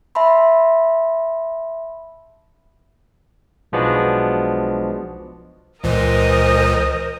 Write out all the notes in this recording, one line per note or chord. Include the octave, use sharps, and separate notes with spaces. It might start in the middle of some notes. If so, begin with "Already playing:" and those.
E5 A5 B5 C6
B1 F3 G#3 B3 D4 F#4
C#2 A#2 E3 A#4 C5 D#5